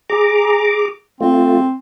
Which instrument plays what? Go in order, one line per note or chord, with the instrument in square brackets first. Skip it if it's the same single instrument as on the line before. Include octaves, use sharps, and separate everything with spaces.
[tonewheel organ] G#4 A#5 D6
[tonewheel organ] A3 F4 [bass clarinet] C4